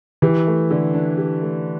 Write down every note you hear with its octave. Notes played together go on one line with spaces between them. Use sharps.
E3 G4
A3
D3
D4
G4
A3